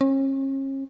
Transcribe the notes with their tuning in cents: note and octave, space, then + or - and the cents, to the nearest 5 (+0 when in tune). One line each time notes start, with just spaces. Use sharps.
C#4 -40